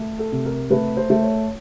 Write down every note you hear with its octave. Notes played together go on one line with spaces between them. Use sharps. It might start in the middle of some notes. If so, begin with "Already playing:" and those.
Already playing: A3
A4
C3
A#4
A3 B4
C5
A3
C#5